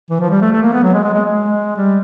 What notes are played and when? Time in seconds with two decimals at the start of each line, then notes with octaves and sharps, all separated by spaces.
0.10 E3
0.20 F3
0.31 G3
0.41 A3
0.52 A3
0.62 A#3
0.73 B3
0.83 F#3
0.93 G#3
1.04 G#3
1.14 G#3
1.25 G#3
1.77 G3